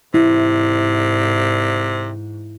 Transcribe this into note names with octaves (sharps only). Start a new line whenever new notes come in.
G#2 C3 E4